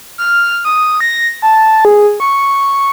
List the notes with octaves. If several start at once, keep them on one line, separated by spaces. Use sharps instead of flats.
F6
D#6
A#6
A5
G#4
C#6